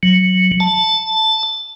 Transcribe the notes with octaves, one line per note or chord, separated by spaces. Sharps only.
F#3
A5